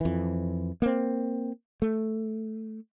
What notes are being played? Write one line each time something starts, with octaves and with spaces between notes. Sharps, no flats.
F2 E3
A#3 C4
A3